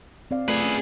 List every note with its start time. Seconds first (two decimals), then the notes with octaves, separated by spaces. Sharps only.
0.31 C4 D5 F5
0.48 A3 F4 G#4 B4 D5
0.63 C#4